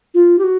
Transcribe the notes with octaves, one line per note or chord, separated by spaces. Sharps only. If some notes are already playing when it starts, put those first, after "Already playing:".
F4
G4
F#4